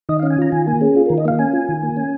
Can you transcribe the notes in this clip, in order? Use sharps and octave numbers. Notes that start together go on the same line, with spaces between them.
D#3 D#5
F5
C#4
G#5
F4 A#5
D#3 G#5
A#3 G#5
C#4 G#4
F4 G#4
A#4
D#3
D#5
A#3 F5
C#4 G#5
F4
D#3
A#3
C#4